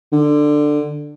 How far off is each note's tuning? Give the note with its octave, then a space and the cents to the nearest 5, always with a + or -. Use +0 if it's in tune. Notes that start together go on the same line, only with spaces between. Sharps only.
D3 +15